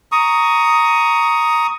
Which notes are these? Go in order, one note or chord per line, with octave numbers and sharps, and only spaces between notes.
A#5 C#6 D#6